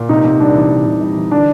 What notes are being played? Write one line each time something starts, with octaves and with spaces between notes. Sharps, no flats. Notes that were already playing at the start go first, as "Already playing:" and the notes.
Already playing: A#2
C3 D#4
C3
G3 D4
E3
C3
C3
G3
E3
D3 D4